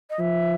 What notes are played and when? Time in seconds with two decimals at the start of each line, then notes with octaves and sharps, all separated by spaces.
0.10 D#5
0.19 F3 E5